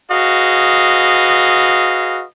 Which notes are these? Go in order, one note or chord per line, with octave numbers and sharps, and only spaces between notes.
F#4 G#4 B4 D#5 F5